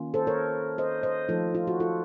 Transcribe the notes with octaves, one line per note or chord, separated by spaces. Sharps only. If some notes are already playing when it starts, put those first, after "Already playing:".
Already playing: D#3 A#3 C#4 F4
A4 C5
A#4 C#5
C5 D#5
C5 D#5
F3 A3 D#4 F4 A4
F4
F#4
F4 A4